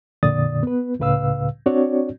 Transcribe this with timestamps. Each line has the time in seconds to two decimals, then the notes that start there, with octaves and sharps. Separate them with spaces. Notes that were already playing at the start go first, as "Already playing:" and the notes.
0.23 F2 A#2 D3 D5 D#6 A6
0.63 B3 B4
0.99 C#2 A2 C#3 B4 F5 E6
1.66 C4 D4 F#4 C#5 D5